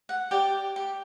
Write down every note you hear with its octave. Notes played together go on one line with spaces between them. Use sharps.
F#5
G4 D5 G5
G4